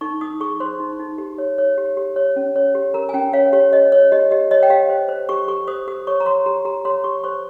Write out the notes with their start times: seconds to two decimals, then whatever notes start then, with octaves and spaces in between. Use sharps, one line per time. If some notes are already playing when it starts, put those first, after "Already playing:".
0.01 D#4 C#6
0.21 D#4 D#6
0.40 G#4 C#6
0.60 C5 C6
0.80 D#4
1.00 D#4
1.18 G4
1.38 C#5
1.58 C#5
1.78 G4
1.97 G4
2.16 C#5
2.36 C#4
2.56 C#5
2.75 G4
2.94 A#4 A#5
3.09 G#5
3.14 C#4 G5
3.33 C#5 F5
3.53 G4 C#5
3.73 C#5 D#5
3.92 C#5
4.12 G4 D#5
4.31 G4 D#5
4.51 C#5 D#5
4.63 G5
4.70 G4 F5
4.90 C5
5.09 C5
5.29 G4 C#6
5.48 G4 C#6
5.68 C5 D#6
5.87 G4 D#6
6.07 C#5 C#6
6.20 A#5
6.26 C#5 C6
6.46 G4 A#5
6.65 G4 A#5
6.85 C#5 C6
7.04 G4 C#6
7.24 C5 C#6